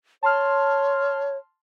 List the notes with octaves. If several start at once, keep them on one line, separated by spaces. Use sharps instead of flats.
C#5 A5 C6 F6